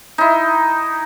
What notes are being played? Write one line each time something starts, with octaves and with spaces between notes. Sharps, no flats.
D#4 E4